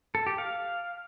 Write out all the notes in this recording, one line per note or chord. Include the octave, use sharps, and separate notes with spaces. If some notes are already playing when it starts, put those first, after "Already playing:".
A4
G4
F5